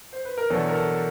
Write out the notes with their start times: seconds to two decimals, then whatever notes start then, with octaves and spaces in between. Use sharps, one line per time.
0.13 C5
0.25 B4
0.37 A#4
0.50 E2 B2 F#3 B3 D4 A4
0.68 A#4
0.75 A4